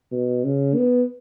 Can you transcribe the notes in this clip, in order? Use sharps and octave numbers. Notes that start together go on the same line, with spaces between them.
B2
C#3
B3